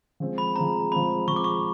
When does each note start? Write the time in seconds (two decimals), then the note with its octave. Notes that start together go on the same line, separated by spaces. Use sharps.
0.20 F3 G#3 C4
0.38 B5
0.56 F3 G#3 C4 A#5
0.92 F3 G#3 C4 B5
1.27 F3 G#3 C4 C#6
1.36 D6
1.44 C#6